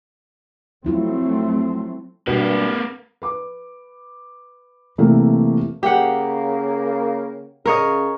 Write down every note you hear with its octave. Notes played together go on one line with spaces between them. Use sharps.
F3 F#3 A3 C4 E4 F4
G2 B2 A#3 B4
B4 D6
C3 E3 A3 A#3
C#3 A#3 G4 F#5
C#3 A#4 C#5 D#5